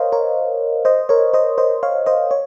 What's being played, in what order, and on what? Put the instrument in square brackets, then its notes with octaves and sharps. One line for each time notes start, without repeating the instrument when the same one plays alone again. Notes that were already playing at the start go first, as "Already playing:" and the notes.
Already playing: [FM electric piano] A#4 C5 C#5 D#5 F5
A#4 C#5
C5 D#5
A#4 C#5
C5 D#5
C5 D#5
C#5 F5
C5 D#5
C#5